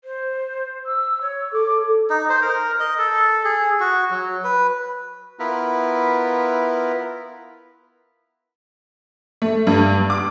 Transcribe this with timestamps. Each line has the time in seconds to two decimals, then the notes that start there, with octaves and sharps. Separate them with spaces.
0.04 C5
0.86 E6
1.21 C#5
1.53 A4 D6
2.10 D#4
2.29 C5
2.42 A#4
2.80 D#5
2.98 A4
3.45 G#4
3.80 F#4
4.11 F#3
4.44 B4
5.40 B3 E4 F4 A#4 B4
9.42 A3
9.67 G2
10.10 D6